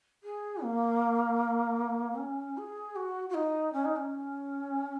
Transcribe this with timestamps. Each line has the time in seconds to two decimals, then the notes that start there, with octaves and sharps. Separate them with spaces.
0.23 G#4
0.62 A#3
2.17 C#4
2.57 G#4
2.95 F#4
3.29 F#4
3.34 D#4
3.73 C#4
3.84 D#4
3.96 C#4